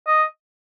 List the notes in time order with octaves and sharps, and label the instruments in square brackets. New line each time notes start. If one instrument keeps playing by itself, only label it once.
[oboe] D#5